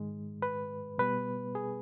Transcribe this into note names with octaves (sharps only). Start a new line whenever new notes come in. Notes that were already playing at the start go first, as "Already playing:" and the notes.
Already playing: G#2 D#3 G#3
B4
B2 G3 B3 B4
G#4